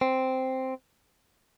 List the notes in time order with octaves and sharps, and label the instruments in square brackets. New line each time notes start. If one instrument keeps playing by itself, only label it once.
[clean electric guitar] C4